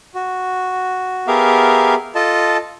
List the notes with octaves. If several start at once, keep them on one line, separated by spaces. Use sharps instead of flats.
F#4
B3 G4 G#4 A#4 E5 F5
F4 A4 D#5 A5